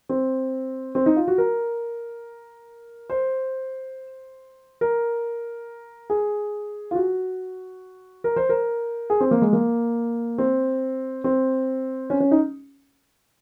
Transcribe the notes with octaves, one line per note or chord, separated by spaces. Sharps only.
C4
C4
D#4
F4
F#4
A#4
C5
A#4
G#4
F4
F#4
A#4
C5
A#4
G#4
C4
A#3
G#3
A#3
C4
C4
C#4
C#4
D#4